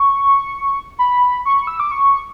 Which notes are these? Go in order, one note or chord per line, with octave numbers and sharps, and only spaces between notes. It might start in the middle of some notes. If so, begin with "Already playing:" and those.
Already playing: C#6
B5
C#6
E6
D6
C#6